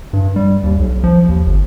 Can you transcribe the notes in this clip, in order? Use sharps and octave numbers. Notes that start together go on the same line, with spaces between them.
G2
G3
D#2
B1
F3
D#2
G1